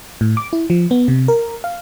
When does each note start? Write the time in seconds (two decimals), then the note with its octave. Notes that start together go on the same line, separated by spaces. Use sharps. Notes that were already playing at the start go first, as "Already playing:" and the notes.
0.21 A2
0.37 D6
0.53 E4
0.70 F3
0.91 B3
1.08 C3
1.28 A#4
1.64 F5